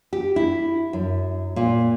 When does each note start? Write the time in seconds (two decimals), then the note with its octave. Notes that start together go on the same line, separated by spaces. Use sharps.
0.13 G4
0.36 E4
0.93 F#2
1.56 A#2